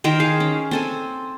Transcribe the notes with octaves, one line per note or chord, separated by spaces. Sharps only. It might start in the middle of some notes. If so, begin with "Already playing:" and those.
D#3 A#4 C5 G5
G#4 F5
C#4
C4 A4 G#5